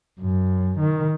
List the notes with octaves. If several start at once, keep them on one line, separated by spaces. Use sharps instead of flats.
F#2
D#3